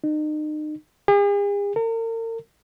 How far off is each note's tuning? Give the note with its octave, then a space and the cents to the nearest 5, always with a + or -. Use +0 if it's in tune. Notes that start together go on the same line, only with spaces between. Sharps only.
D#4 -35
G#4 -45
A#4 -40